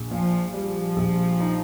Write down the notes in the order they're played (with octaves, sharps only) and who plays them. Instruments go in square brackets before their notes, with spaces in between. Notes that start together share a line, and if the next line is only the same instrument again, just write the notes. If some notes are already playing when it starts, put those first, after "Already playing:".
Already playing: [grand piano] A#1
[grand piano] A#2 [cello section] F3
[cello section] F3 [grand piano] G3
[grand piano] A#1
D#4